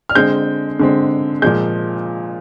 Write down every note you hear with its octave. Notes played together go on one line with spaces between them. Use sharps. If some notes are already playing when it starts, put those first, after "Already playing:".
F6
D3 G#3 C4 G6
D3 G#3 C4
A#2 F3 G#3 G6